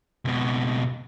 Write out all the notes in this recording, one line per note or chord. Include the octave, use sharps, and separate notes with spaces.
C#2 B2